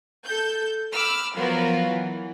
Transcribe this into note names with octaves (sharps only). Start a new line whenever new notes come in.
A4 G6
B5 D6 E6 F6
F3 F#3 B3 F4 F#4 A#4
E3